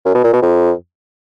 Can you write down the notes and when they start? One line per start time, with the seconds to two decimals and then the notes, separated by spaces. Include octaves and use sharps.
0.06 F#2
0.15 B2
0.24 A#2
0.33 B2
0.42 F2